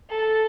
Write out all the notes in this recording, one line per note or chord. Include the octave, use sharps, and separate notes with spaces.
A4